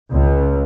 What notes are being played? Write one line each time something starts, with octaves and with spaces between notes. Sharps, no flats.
C#2